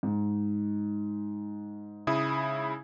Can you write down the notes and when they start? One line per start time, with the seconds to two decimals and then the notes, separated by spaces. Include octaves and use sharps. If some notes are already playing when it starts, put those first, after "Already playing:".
0.03 G#2
2.07 C#3 E4 D#6